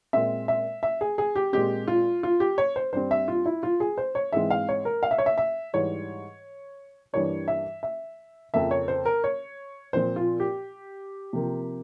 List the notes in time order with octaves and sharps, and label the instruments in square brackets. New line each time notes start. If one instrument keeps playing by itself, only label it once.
[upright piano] A#2 G#3 C4 E5
E5
E5
G#4
G#4
G4
A#2 G#3 C4 G4
F4
F4
G4
C#5
C5
G2 G3 C4 C5
E5
F4
E4
F4
G#4
C5
C#5
G#2 E3 G#3 C4 E5
F5
C#5
A#4
F5
E5
C#5
E5
E5
G#2 E3 G3 C#5
G2 E3 G3 A#3 C#5
E5
E5
F2 C#3 F3 A#3 E5
C#5
C5
A#4
C#5
A#2 F3 C4 C5
F4
G4
C3 F3 A#3